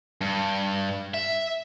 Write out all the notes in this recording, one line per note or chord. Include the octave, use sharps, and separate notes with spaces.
G2
E5